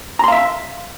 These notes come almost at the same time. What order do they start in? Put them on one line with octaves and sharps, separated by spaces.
A#5 C6 F5 E5